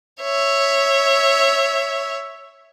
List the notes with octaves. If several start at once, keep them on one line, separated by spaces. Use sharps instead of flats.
C#5 E5